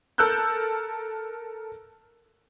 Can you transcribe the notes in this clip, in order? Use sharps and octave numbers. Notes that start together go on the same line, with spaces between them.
A4 A#4 A5 E6 F#6 G6